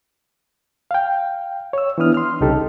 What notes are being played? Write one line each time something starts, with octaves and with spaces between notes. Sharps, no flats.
F5 G5
C#5 E6
E3 B3 D4 E4 D#6 F6
C6 F6
C2 C#3 D#4 G4 A4